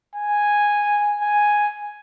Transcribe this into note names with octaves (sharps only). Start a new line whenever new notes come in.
G#5
G#5